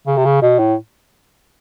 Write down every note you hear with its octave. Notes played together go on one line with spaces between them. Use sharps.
C#3
C3
C#3
B2
A2